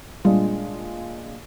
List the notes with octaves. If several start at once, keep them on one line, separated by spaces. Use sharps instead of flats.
A#2 G3 G#3 D4 F4